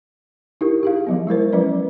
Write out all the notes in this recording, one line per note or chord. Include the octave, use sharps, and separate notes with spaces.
D#4 E4 G4 A#4
G4 G#4 F5
F3 F#3 B3
G#3 E4 A#4 C5
F3 F#3 C#4 B4 D5